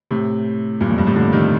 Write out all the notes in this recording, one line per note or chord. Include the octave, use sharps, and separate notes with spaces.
A2 C3
G2 A#2
F2 A2
G2
A2 C3
A#2 D3
C3 D#3